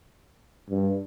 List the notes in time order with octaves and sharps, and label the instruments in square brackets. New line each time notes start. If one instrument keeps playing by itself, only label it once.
[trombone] G2